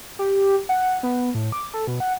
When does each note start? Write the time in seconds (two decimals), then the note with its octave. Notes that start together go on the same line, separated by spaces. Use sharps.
0.19 G4
0.69 F#5
1.03 B3
1.35 A2
1.52 D6
1.74 A4
1.87 B2
2.00 F#5